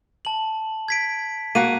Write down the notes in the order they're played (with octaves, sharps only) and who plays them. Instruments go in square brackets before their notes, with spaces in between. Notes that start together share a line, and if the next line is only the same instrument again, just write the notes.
[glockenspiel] A5 F#7
G#6 B6 D7
[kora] A#3 F#4 [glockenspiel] D#7